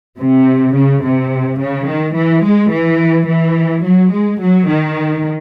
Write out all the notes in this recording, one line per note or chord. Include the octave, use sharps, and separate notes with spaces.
C3
C#3
C3
C#3
D#3
E3
G#3
E3
E3
F#3
G#3
F#3
D#3